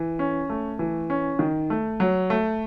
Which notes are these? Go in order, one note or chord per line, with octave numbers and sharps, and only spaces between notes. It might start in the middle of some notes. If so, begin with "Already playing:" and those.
Already playing: E3
C#4
A3
E3
C#4
D#3
A3
F#3
A3